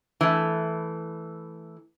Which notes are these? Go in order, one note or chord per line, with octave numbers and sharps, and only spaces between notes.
E3 A3